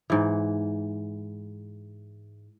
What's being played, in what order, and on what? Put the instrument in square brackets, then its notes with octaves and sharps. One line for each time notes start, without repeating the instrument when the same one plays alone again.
[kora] G#2 E3